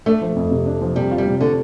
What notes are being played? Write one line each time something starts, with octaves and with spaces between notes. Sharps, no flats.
A3 D4
F3
F2
C3
D4
F3
C3 G3
F4
G3
C3
D3 A3